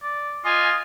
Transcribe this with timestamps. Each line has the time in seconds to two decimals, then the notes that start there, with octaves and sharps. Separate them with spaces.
0.03 D5
0.44 F4 D#5 G#5